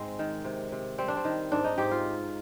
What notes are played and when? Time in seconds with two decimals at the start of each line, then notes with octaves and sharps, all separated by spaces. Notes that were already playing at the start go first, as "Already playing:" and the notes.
Already playing: G#2 G#3 C4
0.19 D#3
0.45 C3
0.72 C3
0.98 G3 C4
1.08 D4
1.17 C4
1.25 D#3
1.52 G#2 D4
1.64 D#4
1.78 G#2 G4
1.91 F4